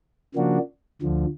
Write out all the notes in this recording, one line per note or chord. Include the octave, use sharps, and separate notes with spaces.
C#3 F3 A#3 D4 F#4
D2 D3 F3